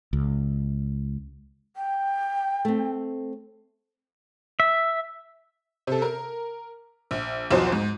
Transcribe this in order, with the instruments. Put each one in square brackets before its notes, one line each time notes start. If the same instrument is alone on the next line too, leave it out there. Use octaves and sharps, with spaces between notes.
[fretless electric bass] C#2
[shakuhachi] G5
[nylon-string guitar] A3 C4
[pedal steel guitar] E5
[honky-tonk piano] C3 A4
A#4
A#1
B1 E2 B2 F3 C5
G#2